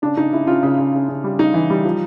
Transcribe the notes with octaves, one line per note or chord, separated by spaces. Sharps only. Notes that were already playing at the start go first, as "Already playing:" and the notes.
C#3 D4
C#3 D#4
C#3 E4
C#3 F4
C#3
C#3
C#3
C#3
G3
C#3 D#4
E3
G3
F3